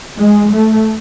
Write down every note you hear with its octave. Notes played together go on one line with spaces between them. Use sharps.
G#3
A3